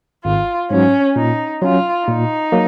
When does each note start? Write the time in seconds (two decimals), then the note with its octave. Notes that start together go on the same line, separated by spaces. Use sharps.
0.24 G#1 F4
0.70 G#2 F#3 C#4
1.16 A#2 D#4
1.61 F#3 C#4 F4
2.07 A#2 D#4
2.52 F#3 A#3